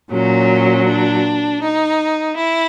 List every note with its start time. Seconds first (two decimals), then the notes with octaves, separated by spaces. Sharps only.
0.10 A#2 F#3 C#4
0.86 D4
1.61 D#4
2.34 E4